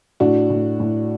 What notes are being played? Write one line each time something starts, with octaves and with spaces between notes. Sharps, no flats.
A2 D4 F#4
A2
A2